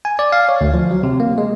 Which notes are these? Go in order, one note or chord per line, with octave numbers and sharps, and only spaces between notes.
G#5
D5
F5
C#5
D2
F3
F#3
C3
A#3
G#3